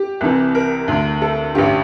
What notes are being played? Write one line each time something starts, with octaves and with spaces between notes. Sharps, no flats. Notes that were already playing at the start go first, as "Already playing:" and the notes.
Already playing: G4
C2 C3 E3
A#4
D2 D3
A4
A1 G2 D3 G4